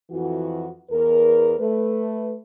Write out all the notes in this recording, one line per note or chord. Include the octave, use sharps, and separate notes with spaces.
F2 E3 F#4
E2 A#4
A3 B4